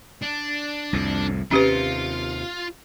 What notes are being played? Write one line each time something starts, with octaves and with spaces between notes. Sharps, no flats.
D4
C2 F2 A2
D#2 C3 C#4 F4 G4 B4